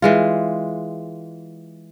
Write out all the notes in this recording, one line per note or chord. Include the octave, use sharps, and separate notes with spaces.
E3 G#3 F4